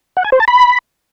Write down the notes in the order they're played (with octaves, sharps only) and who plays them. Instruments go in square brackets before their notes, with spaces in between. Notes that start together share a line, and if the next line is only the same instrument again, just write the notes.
[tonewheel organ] F#5
G#5
C5
A5
B5